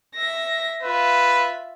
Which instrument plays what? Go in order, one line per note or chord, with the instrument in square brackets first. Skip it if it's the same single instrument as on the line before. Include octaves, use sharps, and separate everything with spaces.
[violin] E5 A#6
[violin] F4 E5 [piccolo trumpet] B4